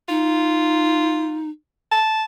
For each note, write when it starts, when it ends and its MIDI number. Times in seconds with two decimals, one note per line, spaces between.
0.09 1.49 63
0.09 1.47 65
1.91 2.24 81